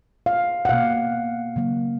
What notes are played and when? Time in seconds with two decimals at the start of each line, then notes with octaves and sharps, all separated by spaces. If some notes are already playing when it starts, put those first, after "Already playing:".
0.26 F5
0.65 F#5
0.69 B2 A#3 F5
1.56 C#3 F#3 A#3